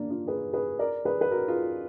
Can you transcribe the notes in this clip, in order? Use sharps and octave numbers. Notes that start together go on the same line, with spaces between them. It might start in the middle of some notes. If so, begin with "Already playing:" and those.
Already playing: A#3 D4
D4 F4
G#4 B4
G#4 B4
A#4 D5
G#4 B4
B4
F#4 A#4
F4 G#4